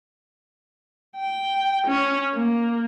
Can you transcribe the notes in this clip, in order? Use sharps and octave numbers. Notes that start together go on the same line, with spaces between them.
G5
C#4
A#3